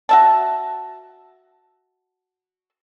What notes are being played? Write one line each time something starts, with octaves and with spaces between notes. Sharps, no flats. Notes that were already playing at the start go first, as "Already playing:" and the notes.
F#4 E5 A5